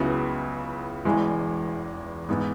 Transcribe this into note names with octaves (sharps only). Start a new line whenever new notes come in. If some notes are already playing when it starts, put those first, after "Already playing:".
Already playing: C#2 C#3 F#3 B3 E4
E1 E2 E3 G#3
G#2 E3 B3 E4